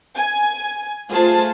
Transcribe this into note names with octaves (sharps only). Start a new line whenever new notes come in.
G#5
A3 F4 G#4 C5 A5